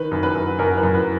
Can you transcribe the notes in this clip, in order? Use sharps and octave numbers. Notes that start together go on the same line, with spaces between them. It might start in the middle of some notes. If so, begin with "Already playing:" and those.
Already playing: D#3 B4
F#2
B4
F#2
F#2 A#4
B4
F#2
B4